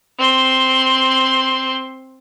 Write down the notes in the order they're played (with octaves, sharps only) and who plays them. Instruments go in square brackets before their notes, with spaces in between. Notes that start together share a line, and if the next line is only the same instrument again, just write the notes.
[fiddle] C4 C6